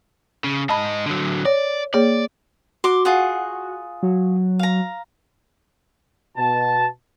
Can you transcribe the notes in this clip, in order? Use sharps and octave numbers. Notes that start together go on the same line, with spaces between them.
C#3
G#2 D#5 A5 B5
D3 F#3
C#5 D5
A#3 G#4 C#5 D5
F#4 C6 D6
F4 G#4 F#5
F#3
F5 A#5
B2 A5